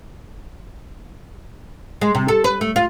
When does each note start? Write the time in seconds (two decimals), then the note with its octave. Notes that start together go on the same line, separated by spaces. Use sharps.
2.01 G#3
2.15 C3
2.28 A4
2.44 B4
2.61 A3
2.76 F4